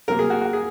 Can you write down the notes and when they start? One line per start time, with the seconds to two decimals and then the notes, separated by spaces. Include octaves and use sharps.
0.08 C3 F#3 A#3 A#4
0.19 G#4
0.30 F#4
0.41 F#4
0.53 G#4